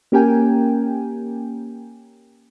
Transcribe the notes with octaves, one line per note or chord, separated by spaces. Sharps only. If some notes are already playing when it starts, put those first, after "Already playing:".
A#3 C#4 G4 A#4 G5 G#5